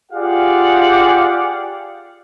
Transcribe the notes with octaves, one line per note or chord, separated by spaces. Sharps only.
F4 G4 G#4 D5 F5 F#5